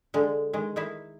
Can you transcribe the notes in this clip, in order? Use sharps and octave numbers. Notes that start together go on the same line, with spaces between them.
D3 G#3
D#3 G#3
D#3 D#4 E4 E5